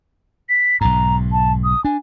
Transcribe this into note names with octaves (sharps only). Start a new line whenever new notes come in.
B6
B1 G#2 A#5
A5
D#6
D4 G#5